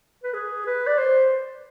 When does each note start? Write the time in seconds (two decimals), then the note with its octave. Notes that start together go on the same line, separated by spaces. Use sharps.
0.24 B4
0.34 G#4
0.66 B4
0.87 D5
0.98 C5